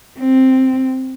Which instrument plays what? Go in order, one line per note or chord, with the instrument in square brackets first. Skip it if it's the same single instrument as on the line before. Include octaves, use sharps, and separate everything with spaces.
[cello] C4